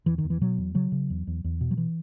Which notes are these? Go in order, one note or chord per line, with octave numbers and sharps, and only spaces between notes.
E2 E3
D#3
E2
E3
B2 F#3
E2
C#3 F#3
C#3
E2
E2
E2
B2
F#3
E3